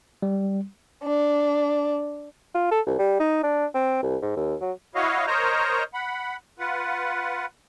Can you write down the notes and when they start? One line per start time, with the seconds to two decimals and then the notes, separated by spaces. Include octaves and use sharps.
0.22 G3
1.04 D4
2.55 F4
2.71 A4
2.86 C2
2.99 G3
3.20 D#4
3.43 D4
3.74 C4
4.03 C2
4.22 G#2
4.36 D#2
4.61 F#3
4.95 E4 F#4 C#5 D#5 F5
5.27 A#4 C5 C#5 D#5 A#5
5.94 F#5 B5
6.59 F4 B4 F#5